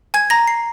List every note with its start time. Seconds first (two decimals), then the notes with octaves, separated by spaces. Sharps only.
0.14 G#5 G#6
0.30 A#5 A#6
0.47 C7